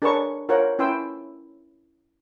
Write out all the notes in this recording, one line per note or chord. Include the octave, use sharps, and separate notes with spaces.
D4 G#4 A#4 B4 C#5 C#6
F4 A#4 C5 C#5 F#5
C#4 E4 B4 G5 C6 E6